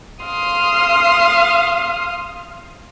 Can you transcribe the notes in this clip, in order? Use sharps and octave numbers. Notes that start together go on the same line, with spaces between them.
F5 C6 D#6